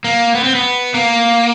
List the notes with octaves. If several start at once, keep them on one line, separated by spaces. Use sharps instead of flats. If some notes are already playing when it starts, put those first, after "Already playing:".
A#3
B3
C4
B3
A#3